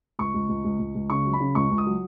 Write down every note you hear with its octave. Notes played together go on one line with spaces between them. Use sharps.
C#2 C#6
C#2
C#2
C#2
C#2
C#2
C#3 C#6
F#3
B5
C#3
C#2 C#6
C#2
D#6
F#3